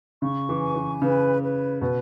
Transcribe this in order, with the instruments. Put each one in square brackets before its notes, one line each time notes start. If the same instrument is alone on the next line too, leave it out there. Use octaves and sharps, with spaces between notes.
[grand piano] C#3 [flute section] C#6
[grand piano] E3
[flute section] G#5
[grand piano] E3
[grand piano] C#3 [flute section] B4
[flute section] B4
[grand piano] B2 [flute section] B4